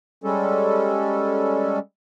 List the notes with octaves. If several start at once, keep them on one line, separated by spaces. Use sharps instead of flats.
G3 G#3 C#4 A4